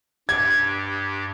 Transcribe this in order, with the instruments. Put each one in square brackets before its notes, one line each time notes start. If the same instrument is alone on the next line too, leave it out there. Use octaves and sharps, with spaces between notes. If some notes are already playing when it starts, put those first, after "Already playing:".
[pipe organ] G2 G4 [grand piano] G#6